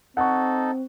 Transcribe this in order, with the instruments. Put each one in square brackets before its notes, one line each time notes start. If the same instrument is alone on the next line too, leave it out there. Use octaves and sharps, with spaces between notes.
[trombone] C4 [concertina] D#4 A4 [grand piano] F#5 C#6